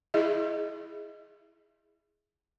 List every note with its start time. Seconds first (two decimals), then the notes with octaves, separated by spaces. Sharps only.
0.14 E4 G#4 D#5 E5